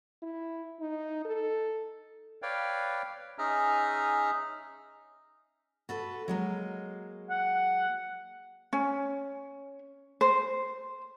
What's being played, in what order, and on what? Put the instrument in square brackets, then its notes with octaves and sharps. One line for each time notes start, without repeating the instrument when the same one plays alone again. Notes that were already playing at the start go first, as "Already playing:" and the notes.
[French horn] E4
D#4
A4
[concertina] B4 C#5 D5 F5 G5
C#4 D#4 G#4 E5 A#5 F6
[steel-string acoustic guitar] F#4 A4 B4
F#3 G#3 A#3
[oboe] F#5
[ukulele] C#4
C5